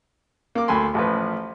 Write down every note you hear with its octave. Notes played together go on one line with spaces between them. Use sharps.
A#3 D6
D2 A4 G#5 B5 C6
A1 F3 B4